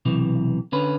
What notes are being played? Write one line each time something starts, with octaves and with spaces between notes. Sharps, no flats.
B1 C3 E3
D3 C#4 B4